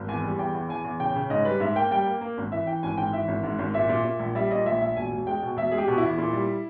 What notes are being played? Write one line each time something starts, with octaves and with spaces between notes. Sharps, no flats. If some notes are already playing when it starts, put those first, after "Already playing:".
Already playing: G#1
E2 G#5
G3
E2 G5
E2
E2 G#5
E2
C#3 G5
C#3
G#2 D#5
G3 B4
G#2 E5
A#3 G5
G3 G5
A#3
A#3
G#1
E3 E5
E3 G5
G#1 G#5
G#2 G5
E3 E5
G#1
G#2
G#1
A#2 E5
A#2
A#2
A#1
G3 E5
A#2 D#5
A#1 E5
A#1 E5
E1 G#5
E1
G#3 G5
B2
E1 E5
G#3 G#4
G4
B2
E4
E2
A#2
G3